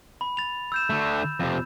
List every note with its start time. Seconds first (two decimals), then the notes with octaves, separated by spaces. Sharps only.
0.21 B5
0.37 A6 F7
0.72 E6 G6 E7
0.90 D3 A3
1.40 F2 C3